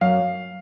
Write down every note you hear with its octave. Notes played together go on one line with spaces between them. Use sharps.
F#2 F5